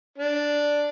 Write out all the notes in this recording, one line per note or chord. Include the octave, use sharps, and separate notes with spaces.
D4